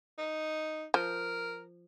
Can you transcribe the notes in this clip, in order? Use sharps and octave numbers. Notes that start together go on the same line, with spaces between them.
D#4
F3 A#4